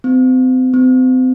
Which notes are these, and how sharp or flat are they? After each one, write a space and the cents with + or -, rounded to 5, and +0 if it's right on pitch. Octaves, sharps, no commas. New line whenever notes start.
C4 -35
C4 -35